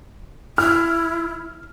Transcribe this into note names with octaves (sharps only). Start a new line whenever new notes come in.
E4 F6